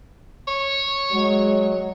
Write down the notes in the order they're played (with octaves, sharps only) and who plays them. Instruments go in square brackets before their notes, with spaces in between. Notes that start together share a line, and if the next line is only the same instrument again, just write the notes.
[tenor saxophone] C#5
[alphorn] F#3 [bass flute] G#3